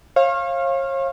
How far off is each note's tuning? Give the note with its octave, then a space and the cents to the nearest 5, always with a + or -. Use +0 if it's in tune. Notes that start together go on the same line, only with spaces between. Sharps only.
C#5 -40 F5 -5